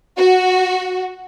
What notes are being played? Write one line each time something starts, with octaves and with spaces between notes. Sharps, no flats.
F#4